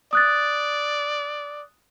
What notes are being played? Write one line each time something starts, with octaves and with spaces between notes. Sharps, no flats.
D5 D#6 F#6 A6